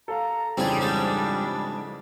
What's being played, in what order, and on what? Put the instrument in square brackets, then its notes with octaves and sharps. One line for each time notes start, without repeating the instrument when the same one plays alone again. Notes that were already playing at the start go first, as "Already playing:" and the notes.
[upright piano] A4 F5 [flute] A#5
[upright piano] F2 C#3 E3 [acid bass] G3 [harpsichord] C4 G#4 [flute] D4
[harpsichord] G#2 G#3